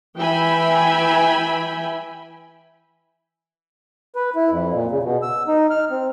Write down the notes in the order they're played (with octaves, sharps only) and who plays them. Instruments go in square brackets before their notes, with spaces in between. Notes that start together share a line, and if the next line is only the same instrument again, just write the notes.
[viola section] E3 E5 G5 G#5 B5
[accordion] B4
E4
F2
A#2
C#3
B2
E6
D#4
F6
C4